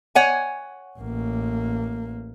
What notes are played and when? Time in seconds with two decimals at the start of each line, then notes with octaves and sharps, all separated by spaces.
0.15 C#5 F#5 G#5
0.99 A1 A#3